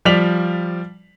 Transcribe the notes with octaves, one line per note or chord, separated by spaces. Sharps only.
F3 G3 D5 B6 F7 F#7